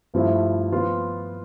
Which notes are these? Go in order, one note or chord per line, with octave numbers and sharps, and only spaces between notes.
G2 F3 A3 E4
F3 B3 F4